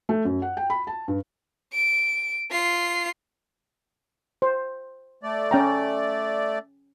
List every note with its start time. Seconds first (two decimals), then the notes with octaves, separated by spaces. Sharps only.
0.09 A3
0.25 F#2
0.42 F#5
0.57 G5
0.70 B5
0.87 A5
1.08 G2
1.73 D7
2.51 F4 C7
4.42 C5
5.23 A3 D5
5.51 C#4 G5 A#5